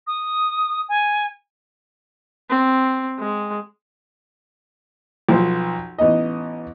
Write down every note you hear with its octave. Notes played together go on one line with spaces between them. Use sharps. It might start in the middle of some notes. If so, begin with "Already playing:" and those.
D#6
G#5
C4
G#3
B1 F3 C5
A1 B3 D#4 D#5